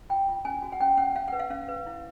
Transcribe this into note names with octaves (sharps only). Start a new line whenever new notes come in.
F4 G5
F4
C#4 G#5
F#4
F#5
C#4 G5
C#4 F#5
C#4 F5
B4 F#5
F5
C#4 F5
B4
E4